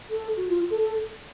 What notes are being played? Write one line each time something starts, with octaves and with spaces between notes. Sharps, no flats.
A4
F#4
F4
A4
A4